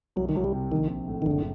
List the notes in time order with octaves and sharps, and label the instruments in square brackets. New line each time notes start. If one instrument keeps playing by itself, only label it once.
[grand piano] C2 [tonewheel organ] F#3
[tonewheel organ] D#3
[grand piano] C2 [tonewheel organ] F#3
[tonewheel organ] G3
[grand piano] C3
[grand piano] A#1 [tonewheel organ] D#3
[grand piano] C4
A2
[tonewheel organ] D#3
[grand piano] F#1 [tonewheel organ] D3